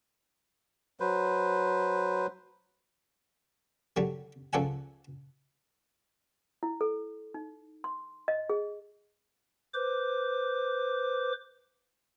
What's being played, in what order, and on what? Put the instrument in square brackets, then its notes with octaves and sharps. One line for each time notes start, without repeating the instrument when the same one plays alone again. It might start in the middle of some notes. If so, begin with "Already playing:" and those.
[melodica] F#3 B4 C5
[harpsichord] D3 F#3 G3
C#2 F3 A4 D5 F#5 G#5
[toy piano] E4
A4
D#4
C6
D#5
G#4
[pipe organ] B4 C5 D6